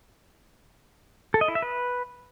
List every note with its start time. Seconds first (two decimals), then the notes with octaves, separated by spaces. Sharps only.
1.34 A4
1.41 D#5
1.48 E4
1.55 E5
1.62 B4